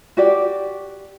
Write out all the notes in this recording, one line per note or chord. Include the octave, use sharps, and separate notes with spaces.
F#4 G4 D5